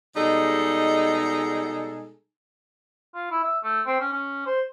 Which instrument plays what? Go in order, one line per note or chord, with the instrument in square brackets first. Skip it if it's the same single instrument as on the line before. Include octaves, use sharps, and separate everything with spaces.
[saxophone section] B2 G3 G#3 D#4 G#4 A4
[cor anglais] F4
E4
E5
A3
C4
C#4
C#4
C5